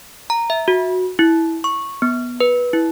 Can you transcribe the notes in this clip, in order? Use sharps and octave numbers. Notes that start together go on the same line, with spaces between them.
A#5
E5
F#4
E4
C#6
B3
B4
E4